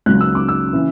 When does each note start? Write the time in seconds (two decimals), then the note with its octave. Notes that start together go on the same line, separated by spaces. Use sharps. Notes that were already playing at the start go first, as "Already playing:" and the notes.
0.06 C#2 C#3 F#3 F#6
0.21 E6
0.35 D6
0.48 E6
0.73 C#3 E3